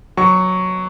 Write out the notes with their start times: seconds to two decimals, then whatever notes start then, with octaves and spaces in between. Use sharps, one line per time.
0.17 F#3 C#6